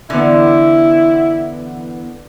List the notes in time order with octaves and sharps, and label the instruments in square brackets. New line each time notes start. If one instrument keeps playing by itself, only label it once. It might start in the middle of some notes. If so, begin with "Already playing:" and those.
[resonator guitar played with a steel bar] D3 [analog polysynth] E3 B3 [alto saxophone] E4